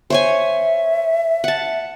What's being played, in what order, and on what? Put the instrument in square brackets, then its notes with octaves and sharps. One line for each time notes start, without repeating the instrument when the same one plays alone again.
[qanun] C5 C#5 G#5 [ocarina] E5
[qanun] F#5 A5